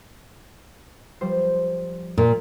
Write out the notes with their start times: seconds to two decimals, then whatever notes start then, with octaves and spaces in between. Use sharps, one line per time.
1.21 F3 G3 C5
2.18 A#2